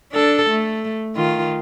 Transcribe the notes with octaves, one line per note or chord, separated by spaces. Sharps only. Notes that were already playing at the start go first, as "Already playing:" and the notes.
D4 A4
A3
D#3 F4